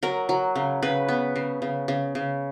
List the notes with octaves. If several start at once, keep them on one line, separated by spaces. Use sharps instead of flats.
F#3 A#4
F#3
C#3
C#3 B4
B3
C#3
C#3
C#3
C#3